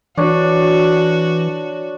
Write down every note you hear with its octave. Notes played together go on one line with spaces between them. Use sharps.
E3 D4 F#4 C#5